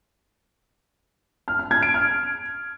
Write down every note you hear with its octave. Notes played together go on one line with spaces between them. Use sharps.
F6
F6
G#6
D7
F6